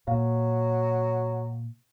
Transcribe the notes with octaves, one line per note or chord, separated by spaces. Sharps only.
A#2 F#3 F5